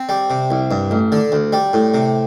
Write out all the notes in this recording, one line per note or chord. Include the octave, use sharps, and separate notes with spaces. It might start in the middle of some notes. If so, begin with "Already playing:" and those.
Already playing: C4
G3
C3
C2
G2
A1
D3
D2
G3
A2
C3